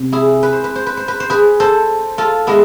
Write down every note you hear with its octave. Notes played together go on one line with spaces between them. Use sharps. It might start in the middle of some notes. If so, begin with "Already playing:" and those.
Already playing: C3
E4 G#4
B4
C5
B4
C5
B4
C5
B4
C5
G#4 B4
A4 C5
F4 A4
G#3 B3 E4 G#4